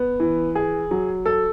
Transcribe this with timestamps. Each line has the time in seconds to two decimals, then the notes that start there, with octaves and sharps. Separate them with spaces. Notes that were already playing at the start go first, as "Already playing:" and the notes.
Already playing: B3
0.20 E3
0.55 G#4
0.91 F#3
1.26 A4